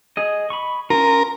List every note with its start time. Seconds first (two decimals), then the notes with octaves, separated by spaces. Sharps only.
0.17 G#4 D#5
0.50 B5 C#6
0.90 C#4 F4 A#4